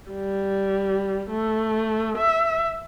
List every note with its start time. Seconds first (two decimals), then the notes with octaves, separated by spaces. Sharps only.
0.11 G3
1.31 A3
2.18 E5